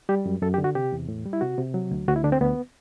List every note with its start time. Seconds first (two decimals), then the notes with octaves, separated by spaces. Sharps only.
0.09 G3 G4
0.26 F#2
0.42 F#2 A4
0.54 G4
0.58 D3
0.64 F#4
0.75 C3 G4
0.92 E2
1.08 A2
1.26 G3
1.33 E4
1.41 C3 F#4
1.58 C3
1.74 F#3
1.91 D2
2.08 D2 F#4
2.16 E4
2.24 D3 D4
2.32 C4
2.40 D2 B3